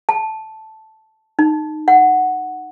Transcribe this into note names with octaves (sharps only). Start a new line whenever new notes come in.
A5
D#4
F#5